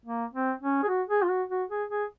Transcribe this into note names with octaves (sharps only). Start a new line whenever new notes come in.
A#3
C4
C#4
G#4
F#4
G#4
F4
F#4
F#4
G#4
G#4